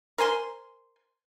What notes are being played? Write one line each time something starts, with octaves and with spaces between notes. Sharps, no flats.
A#4 C5 G#5 C6